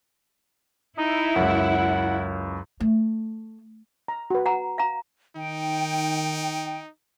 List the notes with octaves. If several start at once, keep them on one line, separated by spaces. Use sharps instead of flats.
D#4 E4
C#2 F#2 F#5
A3
A#5
F#4 B4
F#5 A#5
F5 A#5
D#3 D#4 G5